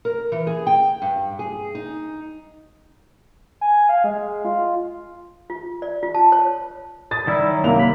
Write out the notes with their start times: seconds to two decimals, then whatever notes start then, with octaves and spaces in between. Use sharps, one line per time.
0.05 A#4
0.32 E3
0.47 G#4
0.67 G5
1.02 G2
1.39 G#4
1.75 D#4
3.61 G#5
3.89 F5
4.04 G#3
4.45 F4
5.50 F4
5.82 D5
6.03 F4
6.14 A5
6.32 C#5
7.11 D#6 A6
7.27 D#3 G3 E4 E6
7.46 F#3
7.64 C2 A#3 F7
7.80 B5